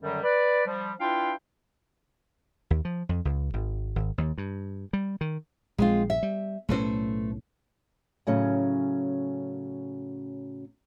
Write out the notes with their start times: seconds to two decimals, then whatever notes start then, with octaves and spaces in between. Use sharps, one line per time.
0.02 F#2 D3 D#3 F#3 G3
0.23 B4 D5
0.66 F3 G3
1.00 D4 E4 F4 B4 F5 G5
2.70 D#2
2.85 F3
3.09 F2
3.25 C#2
3.54 G#1
3.96 G#1
4.18 D#2
4.38 G2
4.93 G3
5.21 D#3
5.78 A#1 G#3 C4 F4
6.10 E5
6.23 G3
6.69 B1 A2 A3 C#4 B4 C5
8.27 A2 C#3 F#3 C#4